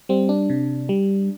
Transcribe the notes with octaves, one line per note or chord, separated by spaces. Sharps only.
G3 C4
D4
C3
G3